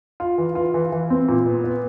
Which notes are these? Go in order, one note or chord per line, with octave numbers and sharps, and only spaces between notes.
F4
E3
F4
E3
E3
C4
A#2
B3
B3